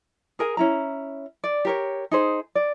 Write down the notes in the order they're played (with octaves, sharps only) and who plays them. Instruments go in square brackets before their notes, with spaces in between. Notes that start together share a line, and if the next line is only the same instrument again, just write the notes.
[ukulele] G#4 A#4 G#5
C#4 E4 A#5
D5
G4 A#4 C#5
D#4 G#4 C5
D5